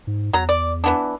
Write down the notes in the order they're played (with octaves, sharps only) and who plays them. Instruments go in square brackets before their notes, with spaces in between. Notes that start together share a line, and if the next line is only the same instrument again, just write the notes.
[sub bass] G#2
[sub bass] E2 [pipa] F#3 A#5
[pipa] D5
E3 B3 D4